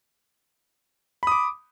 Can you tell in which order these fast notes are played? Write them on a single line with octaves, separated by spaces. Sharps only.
B5 D#6 D6